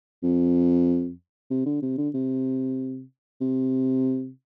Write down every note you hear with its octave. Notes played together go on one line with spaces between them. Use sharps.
F2
C3
D3
C3
D3
C3
C3